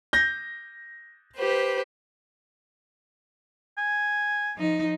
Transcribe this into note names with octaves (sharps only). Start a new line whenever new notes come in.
G6 A#6
G4 B4 C5
G#5
F3 D#4